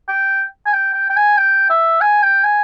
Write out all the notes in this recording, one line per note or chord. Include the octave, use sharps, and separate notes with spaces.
G5
G#5
G5
G5
G5
G#5
G5
E5
G#5
G5
G#5